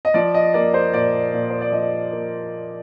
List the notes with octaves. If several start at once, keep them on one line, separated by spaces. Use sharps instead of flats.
D#5
F3 D5
D#5
A#3 D5
C5
A#2 D5
A#2
C5
D5
F3 D#5
A#3